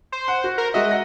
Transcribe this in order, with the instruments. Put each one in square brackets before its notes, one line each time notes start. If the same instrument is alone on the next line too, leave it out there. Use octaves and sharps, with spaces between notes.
[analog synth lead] C5
[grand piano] F#5
F#4
[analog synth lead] A#4
[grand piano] G#3 F#4 E5 [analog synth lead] D#5
[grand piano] F#5 A#6